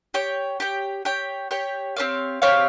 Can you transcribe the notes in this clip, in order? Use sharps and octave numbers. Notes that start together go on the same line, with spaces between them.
G4 C#5 G5
G4 C#5 G5
G4 C#5 G5
G4 C#5 G5
C4 G4 C#5 F5
C4 G4 C#5 F5